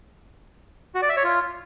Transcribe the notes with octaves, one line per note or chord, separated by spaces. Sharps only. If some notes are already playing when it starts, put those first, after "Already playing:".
F#4
D5
E5
C#5
F4